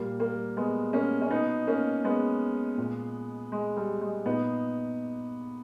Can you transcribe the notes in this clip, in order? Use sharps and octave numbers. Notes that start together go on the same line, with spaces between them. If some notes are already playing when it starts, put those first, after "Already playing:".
Already playing: A#2 G3 A#3
G3 A#3
G#3 B3
A#3 C#4
C#4
B2 B3 D#4
A#3 C#4
G#3 B3
A#2
G#3
G3
G#3
A#2 B3 D#4